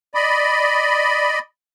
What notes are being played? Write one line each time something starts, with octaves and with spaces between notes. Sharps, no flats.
D5 D#5 B5